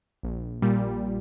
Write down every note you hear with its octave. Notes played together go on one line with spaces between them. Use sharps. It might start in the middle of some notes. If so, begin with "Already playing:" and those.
A#1
A#2 G3